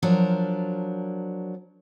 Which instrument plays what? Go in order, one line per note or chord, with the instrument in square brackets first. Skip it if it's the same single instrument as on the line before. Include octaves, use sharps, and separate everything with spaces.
[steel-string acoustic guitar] F3 F#3 D4 A#4